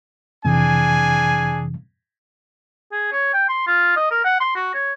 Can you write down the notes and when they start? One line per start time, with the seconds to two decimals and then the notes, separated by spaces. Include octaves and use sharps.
0.45 F2 C3 E3 D4 G#4 G#5
2.92 G#4
3.12 C#5
3.33 G5
3.49 C6
3.67 F4
3.96 D#5
4.11 A#4
4.25 F#5
4.40 C6
4.56 F#4
4.75 C#5